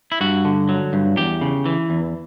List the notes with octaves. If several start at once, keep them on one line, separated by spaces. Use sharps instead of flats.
E4
G2 F#4
D3
F#3
G2
E2 G4
C#3
E3
E2